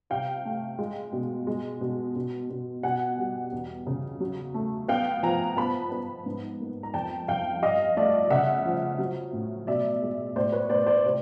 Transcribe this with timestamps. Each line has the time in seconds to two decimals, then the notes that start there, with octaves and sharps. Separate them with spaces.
0.10 C3 F5 G5
0.45 A3
0.79 G#3
1.13 B2
1.47 G#3
1.81 B2
2.16 B2
2.50 B2
2.83 B2 F#5 G#5
3.18 G3
3.52 E2
3.87 C#3
4.20 F#3
4.54 A3
4.88 B3 F5 G5
5.23 F3 G#5 A#5
5.57 B3 A5 B5
5.91 B3
6.26 G#2
6.60 A#3
6.83 A#5
6.94 F2 G5 A5
7.28 F2 F5 G5
7.62 G2 D#5 F5
7.97 A3 D5 E5
8.30 C#3 E5 F#5
8.66 F3
8.98 F#3
9.33 A2
9.67 B2 D5 E5
10.02 G#3
10.36 A2 C5 D5
10.52 B4 C#5
10.70 A2 C5 D5
10.86 C5 D5
11.05 C3